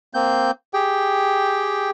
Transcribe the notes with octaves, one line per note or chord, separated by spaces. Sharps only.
A#3 C4 G6
G4 G#4 G5